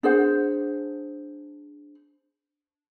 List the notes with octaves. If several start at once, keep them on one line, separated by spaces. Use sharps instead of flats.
D4 G#4 C5 F#5